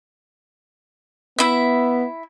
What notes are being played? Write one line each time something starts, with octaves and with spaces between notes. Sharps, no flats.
B3 E4 E5